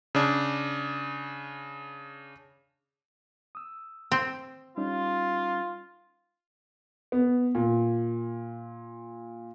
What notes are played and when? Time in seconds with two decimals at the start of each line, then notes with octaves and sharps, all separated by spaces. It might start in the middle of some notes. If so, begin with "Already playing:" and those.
0.15 C#3 D4
3.55 D#6 E6
4.12 C4
4.77 G3 C#4 D#4 F4
7.12 B3
7.55 A#2